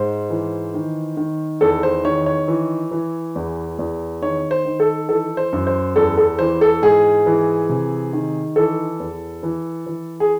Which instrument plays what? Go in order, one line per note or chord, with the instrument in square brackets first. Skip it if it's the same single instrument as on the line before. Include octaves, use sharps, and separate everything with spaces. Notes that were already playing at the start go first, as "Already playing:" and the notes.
Already playing: [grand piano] G#2 C5
E3
D#3
D#3
E2 A4
C5
D#3 C#5
C#5
E3
E3
E2
E2
D#3 C#5
C5
D#3
A4
E3 A4
C5
F#2
C5
E2 A4
A4
E3 C5
A4
G#2 G#4
E3
C3
D#3
E3 A4
E2
E3
E3
G#4